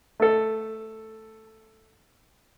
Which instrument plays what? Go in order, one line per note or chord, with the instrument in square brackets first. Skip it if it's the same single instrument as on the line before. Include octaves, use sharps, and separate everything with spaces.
[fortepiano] A3 A4